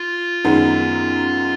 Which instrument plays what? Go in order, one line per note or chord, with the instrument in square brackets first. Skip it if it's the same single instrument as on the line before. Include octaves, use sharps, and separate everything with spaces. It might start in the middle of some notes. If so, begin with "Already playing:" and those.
Already playing: [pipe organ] F4
[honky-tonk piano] F#2 D#3 G#3 B3